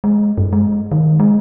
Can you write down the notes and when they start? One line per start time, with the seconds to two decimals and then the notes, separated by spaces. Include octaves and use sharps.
0.04 G#3
0.38 G2
0.53 G#3
0.92 D#3
1.20 G#3